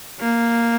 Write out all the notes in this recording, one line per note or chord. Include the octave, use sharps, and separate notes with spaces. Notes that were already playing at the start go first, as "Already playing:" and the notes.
A#3